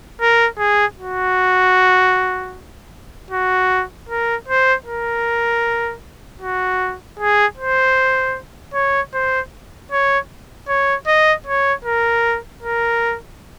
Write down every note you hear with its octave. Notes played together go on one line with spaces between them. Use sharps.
A#4
G#4
F#4
F#4
A#4
C5
A#4
F#4
G#4
C5
C#5
C5
C#5
C#5
D#5
C#5
A#4
A#4